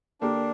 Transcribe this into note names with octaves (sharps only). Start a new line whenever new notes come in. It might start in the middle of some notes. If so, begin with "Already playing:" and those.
D3 A#3 D4 G4 A#4